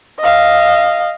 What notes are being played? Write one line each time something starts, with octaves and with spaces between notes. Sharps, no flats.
D#5 F5